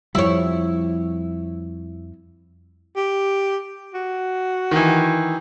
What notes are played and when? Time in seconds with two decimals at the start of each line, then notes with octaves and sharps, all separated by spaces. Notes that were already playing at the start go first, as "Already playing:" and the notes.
0.15 F2 F3 G3 E4 C#5
2.96 G4
3.94 F#4
4.71 D#3 E3